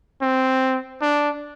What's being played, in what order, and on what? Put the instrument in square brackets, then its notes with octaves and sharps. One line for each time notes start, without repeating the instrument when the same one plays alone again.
[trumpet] C4
D4